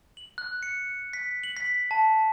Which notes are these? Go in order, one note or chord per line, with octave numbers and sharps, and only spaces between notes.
F#7
F#6
C#7
B6
F#7
B6
A5